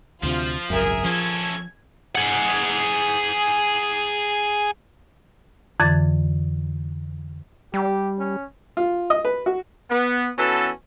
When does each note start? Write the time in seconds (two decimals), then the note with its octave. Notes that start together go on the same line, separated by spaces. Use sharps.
0.23 D2 C3 F3 F4
0.70 G#1 C#2 F#2 G#4 A#4 E5
1.05 F3 C#4 A4 G#6
2.15 G#4 F#5
5.80 F2 D3 E3 D6 G#6 A6
7.74 G3 G4
8.19 C#4
8.77 F4
9.10 D#5
9.25 B4
9.46 F#4
9.90 B3
10.37 E3 B3 C#4 F#4 A4